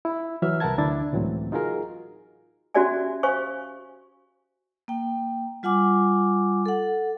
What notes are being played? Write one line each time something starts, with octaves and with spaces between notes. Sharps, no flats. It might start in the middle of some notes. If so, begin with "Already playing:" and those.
E4
E3 F#3 E5 F6
C2 A#4 B4 F#5 A5 G#6
D2 D3 D4 E4 A6
C#2 A2 E3 F#3 C4
D#4 F4 F#4 G#4 A#4
C#4 F#4 G4 D5 E5 G#5
C5 F5 G#5 C#6
A#3 G5
G3 F4 F#5 G#5 D6
A4 F#5